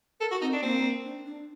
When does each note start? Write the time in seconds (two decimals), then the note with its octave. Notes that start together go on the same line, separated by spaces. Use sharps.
0.20 A4 A#4
0.31 F#4
0.41 C4 D#4
0.53 D4
0.62 A#3 C4
1.05 D4
1.26 D4